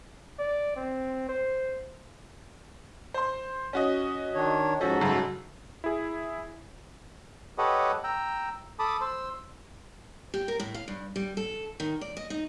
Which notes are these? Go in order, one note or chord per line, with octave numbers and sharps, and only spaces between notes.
D5
C4
C5
C5 C6
C#4 F#4 D#5
D#3 D4 C#5
G#2 F3 C#4 F#4 A4
F#2 C#3
E4 G#4
G4 A4 B4 C#5 D#5 F#5
G5 A#5 E6
A4 A5 B5 D6 D#6
C5 E6
G4
A#4
A2
F5
G2
G3
A4
D#3
D5
D#5
D#4